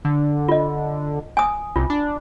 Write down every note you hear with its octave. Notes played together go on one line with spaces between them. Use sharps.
D3
F4 D#5
G#5 D#6
C2 F4
D4